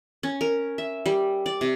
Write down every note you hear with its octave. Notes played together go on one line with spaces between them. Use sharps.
C#4
A#4
E5
G3
D5
C3